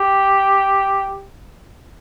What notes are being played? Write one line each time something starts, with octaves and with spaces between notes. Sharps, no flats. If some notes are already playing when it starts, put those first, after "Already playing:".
Already playing: G4